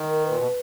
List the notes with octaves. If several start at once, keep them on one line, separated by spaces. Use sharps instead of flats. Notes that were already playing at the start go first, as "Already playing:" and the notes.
Already playing: D#3
A#4
B4
A#2
B2